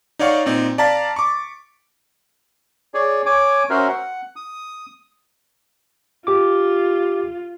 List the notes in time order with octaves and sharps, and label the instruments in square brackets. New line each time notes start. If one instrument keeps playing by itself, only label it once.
[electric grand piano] D#4 C#5 D5 F5 F#5 C#6
A#2 C4 D#4
D5 F5 A5 A#5 A6 B6
C#6 D6
[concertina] G#4 C#5 D5
C#5 G#5 D6
C#4 F#4 A#4 C5 E5
F#5
D#6
[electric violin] F4 [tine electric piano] G4 D6